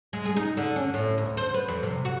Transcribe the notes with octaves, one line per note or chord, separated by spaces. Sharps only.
G#3
G#4
D#4
D3
C#4
A2
D2
C5
B4
F2
C3
F#4